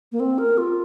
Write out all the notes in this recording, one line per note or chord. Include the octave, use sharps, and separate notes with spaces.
A#3
C4
A#4
F4